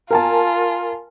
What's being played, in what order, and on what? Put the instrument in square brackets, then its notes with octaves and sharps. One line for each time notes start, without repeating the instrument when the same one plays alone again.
[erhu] F4 [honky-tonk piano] A#4 G#5 A5